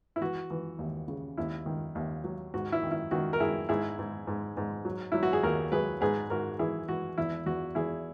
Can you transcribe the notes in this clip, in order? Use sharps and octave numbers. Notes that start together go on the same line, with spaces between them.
E4
E3 F#4
E3
D#2
C#3
D#2 E4
D#3
D#2
F#3
G#2 F#4
E4
D#3
E4
D#3 F#4
A#4
D#3 E4 G#4
G#2 E4 G#4
G#2
G#2
G#2
F#3
F#3 E4
F#4
G#4
D#2 F#4 A#4
F#3 G#4 B4
G#2 G#4 B4
G#2 F#4 A#4
E3 E4 G#4
E3 F#4
E2 E4
E2 F#4
E2 E4 G#4